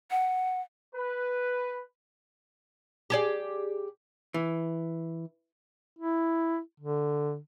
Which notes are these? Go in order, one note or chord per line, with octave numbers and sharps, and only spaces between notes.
F#5
B4
G4 G#4 D5
E3
E4
D3